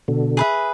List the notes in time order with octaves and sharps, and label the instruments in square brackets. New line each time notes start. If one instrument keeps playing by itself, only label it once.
[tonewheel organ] B2 D3
[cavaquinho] G#4 B4 E5